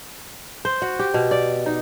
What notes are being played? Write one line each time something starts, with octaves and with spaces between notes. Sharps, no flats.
C5
F#4
G4
B2
D5
D#4